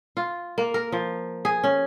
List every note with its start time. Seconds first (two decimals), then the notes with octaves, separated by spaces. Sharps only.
0.17 F4
0.58 A#3
0.74 A#4
0.92 F3
1.45 G#4
1.64 C#4